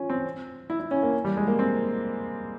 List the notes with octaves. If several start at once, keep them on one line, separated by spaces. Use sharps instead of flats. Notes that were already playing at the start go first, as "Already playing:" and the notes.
Already playing: C#4 F4
C4
E4
E4
C#4
A#3
G3
G#3
A#3
C4